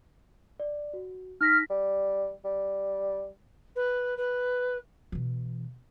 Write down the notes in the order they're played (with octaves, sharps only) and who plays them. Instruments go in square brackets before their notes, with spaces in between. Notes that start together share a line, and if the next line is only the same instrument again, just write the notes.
[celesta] D5
F#4
[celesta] D#4 A#6 B6 [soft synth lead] F6
[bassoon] G3
G3
[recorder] B4
B4
[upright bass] B2 E3